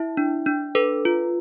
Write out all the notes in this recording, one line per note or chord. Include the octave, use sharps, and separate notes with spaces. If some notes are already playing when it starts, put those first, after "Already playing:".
Already playing: E4 E5
D4
D4
A4 B4
F4